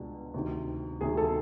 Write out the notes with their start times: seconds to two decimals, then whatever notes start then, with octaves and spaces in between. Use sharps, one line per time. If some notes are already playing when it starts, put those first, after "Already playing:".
Already playing: C#2 B2 G#3 D4
0.34 D2 C3 D#3
1.01 D2 C3 D#3 G#4
1.17 A4